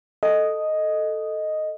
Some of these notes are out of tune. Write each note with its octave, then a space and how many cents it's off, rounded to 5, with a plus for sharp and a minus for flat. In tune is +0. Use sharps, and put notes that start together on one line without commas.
A4 +0 D#5 +0